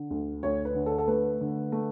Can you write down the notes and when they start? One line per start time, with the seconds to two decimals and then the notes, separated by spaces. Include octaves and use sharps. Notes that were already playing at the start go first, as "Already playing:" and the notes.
Already playing: D3
0.11 D2
0.43 D2 C#5
0.65 B4
0.75 D3
0.86 A4
0.98 A4
1.08 A3 B4
1.41 D3
1.72 A3